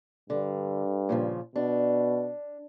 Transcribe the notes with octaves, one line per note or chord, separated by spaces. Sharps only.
G2 D3
A#2 C#3 F3
B2 D4